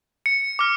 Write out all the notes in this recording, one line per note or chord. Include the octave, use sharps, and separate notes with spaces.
C#7
D6 F6